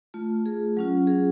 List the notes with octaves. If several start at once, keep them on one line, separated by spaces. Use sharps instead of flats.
A3 F4
G#4
F#3 C#4 F4
G#4